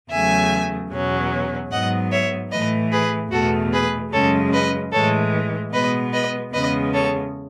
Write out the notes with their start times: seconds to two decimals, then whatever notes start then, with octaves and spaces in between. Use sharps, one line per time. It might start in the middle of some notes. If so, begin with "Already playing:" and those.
0.11 E2 C#3 F#3 A3 E5 G#5
0.91 E2 B2 F#3 C#4
1.71 G#2 F#3 B3 D#5 F#5
2.12 C#5 E5
2.52 A2 E3 A3 B4 D#5
2.92 G#4 B4
3.32 E2 B2 A3 F#4 A4
3.73 G#4 B4
4.13 F#2 C#3 G#3 C#4 A4 C#5
4.53 B4 D#5
4.93 A2 E3 G#3 A4 C#5
5.73 B2 G#3 B3 B4 D#5
6.13 B4 D#5
6.53 E2 C#3 G#3 B3 B4 D#5
6.94 A4 C#5